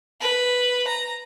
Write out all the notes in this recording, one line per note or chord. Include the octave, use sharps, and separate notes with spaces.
B4
A#5